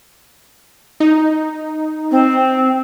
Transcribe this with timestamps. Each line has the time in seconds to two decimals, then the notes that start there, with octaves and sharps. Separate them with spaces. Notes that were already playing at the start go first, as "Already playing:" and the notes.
1.00 D#4
2.11 C4